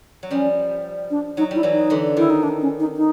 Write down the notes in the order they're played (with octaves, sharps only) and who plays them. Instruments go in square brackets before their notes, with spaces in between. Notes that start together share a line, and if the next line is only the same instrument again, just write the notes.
[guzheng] F#3
[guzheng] F3 G3 [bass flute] C#4
[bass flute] D4
[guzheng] F#3 [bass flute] D#4
[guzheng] G3 [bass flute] E4
[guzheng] E3 F#3
[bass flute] D#4
[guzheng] D3 E3
[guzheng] D#3 [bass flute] E4
[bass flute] D#4
D4
C#4
D#4
D#4